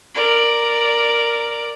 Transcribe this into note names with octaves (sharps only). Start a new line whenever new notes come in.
A#4 D5